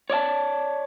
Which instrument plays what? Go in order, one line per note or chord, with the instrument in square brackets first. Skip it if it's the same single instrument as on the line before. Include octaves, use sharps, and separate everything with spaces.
[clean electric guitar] C#5 D5 E5 A5